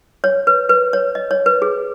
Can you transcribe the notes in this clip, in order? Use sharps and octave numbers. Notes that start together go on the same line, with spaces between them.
C#5
B4
B4
C#5
D#5
C#5
B4
G#4